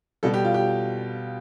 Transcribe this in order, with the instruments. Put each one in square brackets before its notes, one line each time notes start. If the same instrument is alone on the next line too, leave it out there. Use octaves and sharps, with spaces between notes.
[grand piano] B2 G3 A4
G4
F4
G4